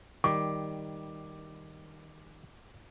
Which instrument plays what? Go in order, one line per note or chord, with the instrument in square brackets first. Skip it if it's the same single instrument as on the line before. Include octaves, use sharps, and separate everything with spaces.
[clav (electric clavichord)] D#3 G3 [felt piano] D6